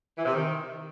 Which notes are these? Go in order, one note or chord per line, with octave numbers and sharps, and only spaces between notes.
E3
C3
D#3